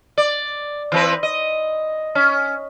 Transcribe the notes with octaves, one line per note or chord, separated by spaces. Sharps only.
D5
E3 C4 B4
D#5
C#4